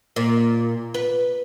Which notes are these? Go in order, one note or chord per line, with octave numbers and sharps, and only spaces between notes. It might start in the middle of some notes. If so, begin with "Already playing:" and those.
A#2
B4